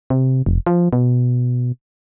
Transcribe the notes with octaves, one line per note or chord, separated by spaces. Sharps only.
C3
F1
F3
B2